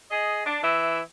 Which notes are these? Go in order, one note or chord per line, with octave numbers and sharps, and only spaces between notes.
G#4 D#5
D4
E3 E5